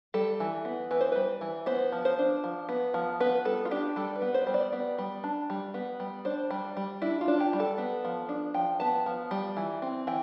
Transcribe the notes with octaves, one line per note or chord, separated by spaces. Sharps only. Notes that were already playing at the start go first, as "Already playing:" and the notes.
G3 A4
E3
B3
E3 B4
C5
G3 B4
E3
B3 C5
F3
C5
D4
F3
B3
F3
B3 B4
G3 A4
F4
D4 G4
G3 A4
B4
B3
C5
G3
D5
B3
G3
D4
G3
B3
G3
D4 C5
G3
G3
D4 E4
F4
D4
G4
G3
A4
B3
F3
D4
F3 G5
B3 A5
F3
G3
E3
C4
E3 G5